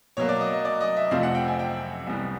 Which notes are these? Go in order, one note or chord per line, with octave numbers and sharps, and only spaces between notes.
B2 F#3 A#3 C#5
D5
D#5
D#5
D5
D#5
E5
F2 C3 F3 A3 C4 F5
F#5
G5
G#5
G5
C2 C3 E3 G3 B3